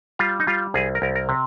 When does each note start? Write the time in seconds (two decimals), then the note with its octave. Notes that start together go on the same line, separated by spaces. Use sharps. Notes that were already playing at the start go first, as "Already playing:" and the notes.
0.19 G3 F4
0.40 D#4
0.47 G3 F4
0.74 C2 G#4
0.95 A#4
1.02 C2
1.16 A#4
1.29 C3